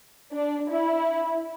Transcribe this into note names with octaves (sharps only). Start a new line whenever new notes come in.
D4
E4